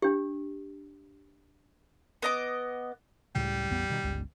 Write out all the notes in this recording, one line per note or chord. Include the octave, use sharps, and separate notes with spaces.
D4 G4
B3 D#5 D6
C#2 A2 C#3 G3
A1 E2 B3
B2 D#3
G1 C#2 G#3